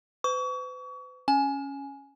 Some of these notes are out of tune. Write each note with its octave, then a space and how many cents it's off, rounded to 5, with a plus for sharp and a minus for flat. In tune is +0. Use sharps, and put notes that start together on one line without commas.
B4 +45 C#6 +35
C#4 +0 G#5 +10